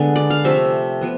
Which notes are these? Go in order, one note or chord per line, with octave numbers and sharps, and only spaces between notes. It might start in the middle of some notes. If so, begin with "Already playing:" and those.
Already playing: D3 G#3 B3
D5
F5
C3 F3 A3 E5
F3 B3